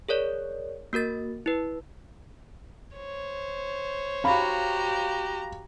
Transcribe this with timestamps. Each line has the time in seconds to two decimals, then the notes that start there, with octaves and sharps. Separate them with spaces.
0.09 G#4 A#4 C#5 D5
0.93 A#3 F#4 A#4 A6
1.46 E4 B4
2.97 C5 C#5
4.24 F#4 G4 F5 A#5 B5